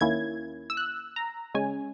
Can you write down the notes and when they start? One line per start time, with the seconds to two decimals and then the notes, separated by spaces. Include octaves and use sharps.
0.01 D#2 D#3 A#3 C#4 E4 G#6
0.70 E6
0.77 F#6
1.16 A#5
1.55 C#3 G#3 C#4 G#5